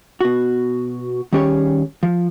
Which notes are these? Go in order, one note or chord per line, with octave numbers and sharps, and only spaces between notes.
B2 F#4
D#3 G3 C#4 G4 G#4 C#5
F3